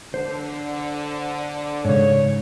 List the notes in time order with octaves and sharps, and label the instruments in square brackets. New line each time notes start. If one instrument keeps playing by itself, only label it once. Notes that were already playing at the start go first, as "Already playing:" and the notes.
[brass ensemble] D3 [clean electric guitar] C5
[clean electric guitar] G#2 C#3 [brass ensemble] C#5